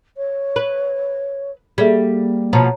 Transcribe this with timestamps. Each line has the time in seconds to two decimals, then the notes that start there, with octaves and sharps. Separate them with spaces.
0.17 C#5
0.56 B4
1.78 G3 A#3 G#4 A4 E5
2.53 B2 F3 C#5 A5 A#5